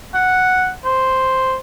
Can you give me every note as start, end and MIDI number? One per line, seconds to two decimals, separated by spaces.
0.14 0.70 78
0.85 1.55 72